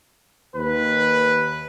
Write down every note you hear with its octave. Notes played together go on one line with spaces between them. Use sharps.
D#2 B4